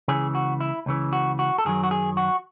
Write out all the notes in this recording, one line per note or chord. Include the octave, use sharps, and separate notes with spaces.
C#2 C#3 E3 G#4
F#4
E4
C#2 C#3 E3
F#4
F#4
A4
F#2 D#3 F#3 G#4
F#4
G#4
F#4